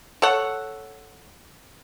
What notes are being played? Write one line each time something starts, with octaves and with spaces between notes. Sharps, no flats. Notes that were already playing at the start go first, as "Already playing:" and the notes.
A4 C#5 F#5